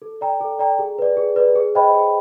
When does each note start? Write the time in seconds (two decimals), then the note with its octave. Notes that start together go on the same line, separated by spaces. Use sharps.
0.02 A4
0.21 D5 G5 A#5
0.41 A4
0.59 D5 G5 A#5
0.79 G#4
0.98 B4 D5
1.17 G#4
1.36 B4 D5
1.56 G#4
1.75 C5 D#5 G5 B5
1.94 G#4